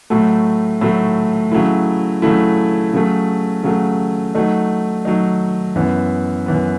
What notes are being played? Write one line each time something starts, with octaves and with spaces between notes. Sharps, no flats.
A2 F#3 A3
A2 F#3 A3
C#3 F#3 A3 E4
C#3 F#3 A3 E4
C#3 F#3 A3
C#3 F#3 A3
F#3 A3 D#4
F#3 A3 D#4
F#2 E3 B3
F#2 E3 B3